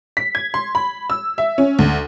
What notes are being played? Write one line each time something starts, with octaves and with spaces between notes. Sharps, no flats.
B6
G#6
C6
B5
E6
E5
C#4
D2